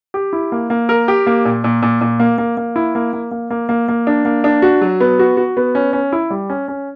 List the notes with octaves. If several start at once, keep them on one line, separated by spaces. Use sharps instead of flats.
G4
E4
A#3
A#3
A#4
G4
A#3
A#2
A#2
A#2
A#2
A#3
A#3
A#3
E4
A#3
A#3
A#3
A#3
A#3
A#3
D4
A#3
D4
F#4
F#3
B3
F#4
F#4
B3
C#4
C#4
E4
G3
C#4
C#4